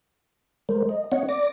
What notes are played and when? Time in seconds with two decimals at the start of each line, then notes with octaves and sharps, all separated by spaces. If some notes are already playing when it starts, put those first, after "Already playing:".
0.69 G#3 A#4 C5
0.89 D#5
1.12 C4 C#5 D#5 F#5
1.29 D5 D6 A#6